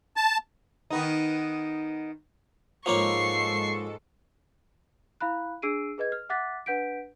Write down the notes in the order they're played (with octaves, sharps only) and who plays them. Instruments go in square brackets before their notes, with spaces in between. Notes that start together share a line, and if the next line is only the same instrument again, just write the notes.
[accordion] A5
[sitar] D#3 B3 D#4
[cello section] G#2 G#3 A4 [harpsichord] F3 A#3 C#5 [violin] C#6 C7
[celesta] E4 F5 B5 F#6
D4 G#4 E6 C7 D7 D#7
G#4 B4 D#5 G#6
F6
E5 F#5 D6 F#6 A6 B6
D4 B4 F#5 G6 B6 D7